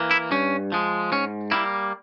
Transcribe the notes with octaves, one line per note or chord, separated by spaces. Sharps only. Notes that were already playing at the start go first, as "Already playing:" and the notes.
Already playing: E3 A#3
E4
G2 C#4
F3 G#3
G#2 C#4
G3 A#3 E4